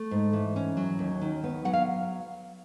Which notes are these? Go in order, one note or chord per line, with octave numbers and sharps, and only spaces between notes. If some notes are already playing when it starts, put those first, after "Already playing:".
Already playing: A3
G#2
E3
C#4
F#3
D#2
D#3
B3
F#3 F#5
F5